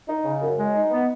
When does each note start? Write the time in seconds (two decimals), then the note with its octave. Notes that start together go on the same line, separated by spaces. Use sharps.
0.08 D#4
0.25 C#3
0.41 F#2
0.58 G#3
0.75 D#4
0.91 B3